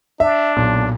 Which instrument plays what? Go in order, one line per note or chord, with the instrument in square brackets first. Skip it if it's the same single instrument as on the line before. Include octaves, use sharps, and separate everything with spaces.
[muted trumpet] D4 [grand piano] E5
[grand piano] B1 [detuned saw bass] A#2